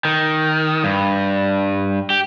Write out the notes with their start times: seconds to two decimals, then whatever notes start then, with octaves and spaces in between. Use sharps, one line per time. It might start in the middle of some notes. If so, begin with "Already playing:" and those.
0.05 D#3
0.84 G2
2.10 G4